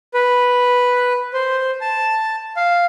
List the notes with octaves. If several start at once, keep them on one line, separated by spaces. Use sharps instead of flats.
B4
C5
A5
F5